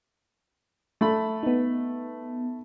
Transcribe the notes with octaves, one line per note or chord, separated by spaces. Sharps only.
A3 B5
B3 D#4